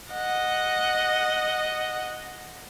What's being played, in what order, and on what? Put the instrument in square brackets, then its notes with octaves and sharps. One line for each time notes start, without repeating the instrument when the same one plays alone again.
[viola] D#5 F#5